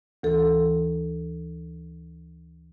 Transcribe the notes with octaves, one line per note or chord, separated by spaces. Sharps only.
D2 E3 A4